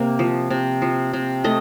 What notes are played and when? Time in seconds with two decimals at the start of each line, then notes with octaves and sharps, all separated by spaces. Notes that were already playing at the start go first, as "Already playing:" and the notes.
Already playing: C3 A#3
0.19 F3
0.50 C3
0.82 F3
1.13 C3
1.44 A3 D#5